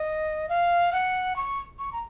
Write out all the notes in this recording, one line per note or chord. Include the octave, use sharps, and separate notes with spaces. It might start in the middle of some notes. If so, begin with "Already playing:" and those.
Already playing: D#5
F5
F#5
C#6
C#6
A#5